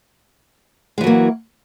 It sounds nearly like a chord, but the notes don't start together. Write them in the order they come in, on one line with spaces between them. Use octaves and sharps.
G#3 E3 F#3 A#3